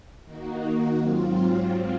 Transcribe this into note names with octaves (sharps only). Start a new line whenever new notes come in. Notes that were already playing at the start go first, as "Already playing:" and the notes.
D#3 A#3 D#4 F#4
G#2 F#3 C4 F4